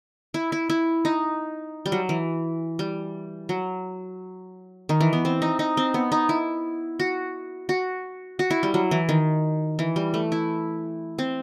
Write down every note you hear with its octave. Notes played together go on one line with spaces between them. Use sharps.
E4
E4
E4
D#4
G3
F#3
E3
G3
F#3
D#3
E3
B3
C4
D#4
D#4
C4
B3
D#4
E4
F#4
F#4
F#4
E4
G3
F#3
E3
D#3
E3
G3
A3
E4
C4